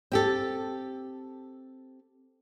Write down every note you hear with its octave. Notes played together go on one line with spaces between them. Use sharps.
C4 G4 A4